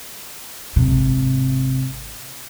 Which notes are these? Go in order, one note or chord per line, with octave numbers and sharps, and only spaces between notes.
G#1 C3